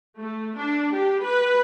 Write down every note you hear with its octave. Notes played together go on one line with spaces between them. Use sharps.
A3
D4
G4
B4